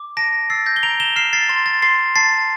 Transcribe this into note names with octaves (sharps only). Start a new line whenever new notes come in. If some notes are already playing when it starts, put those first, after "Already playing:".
Already playing: D6
A5 A#6 D7
E6 A6 C7
G6 A#6
G7
A#5 D7 F7
E7 G7
F6 C7 E7
A6 C7
C6 A6
A6
C6 A6 C7
A5 A6 C7